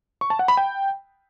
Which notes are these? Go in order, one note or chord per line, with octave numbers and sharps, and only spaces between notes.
C#6
A5
F#5
B5
G5